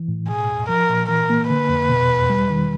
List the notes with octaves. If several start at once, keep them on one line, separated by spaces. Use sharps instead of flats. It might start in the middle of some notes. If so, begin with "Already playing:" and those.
Already playing: E3
A2
B2 G#4
E2
F3 A#4
A#2
E3 A#4
A#3
D3 B4
F2
B2
E2
G3
D#3